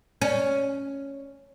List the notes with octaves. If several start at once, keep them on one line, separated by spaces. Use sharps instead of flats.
C#4